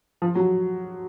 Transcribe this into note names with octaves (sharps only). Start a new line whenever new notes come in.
F3
F#3